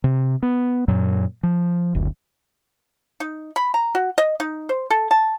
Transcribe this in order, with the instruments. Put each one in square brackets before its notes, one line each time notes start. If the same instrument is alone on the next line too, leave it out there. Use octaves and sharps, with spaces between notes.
[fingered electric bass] C3
B3
F#2 A#2 F#3
F3
F#1 D2
[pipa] D#4
B5
A#5
F#4
D#5
D#4
C5
A4
A5